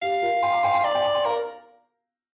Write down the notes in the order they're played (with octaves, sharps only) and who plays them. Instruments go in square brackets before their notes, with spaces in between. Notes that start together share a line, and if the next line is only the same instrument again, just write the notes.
[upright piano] G4 [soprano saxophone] F5
[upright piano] F4 A#4
G5 C6
A#5 D6
G5 C6
G5 C6
[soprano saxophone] D5 [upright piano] A#5 D6
[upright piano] G5 C6
A#5 D6
G5 C6
[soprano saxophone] A#4 [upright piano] F5 A#5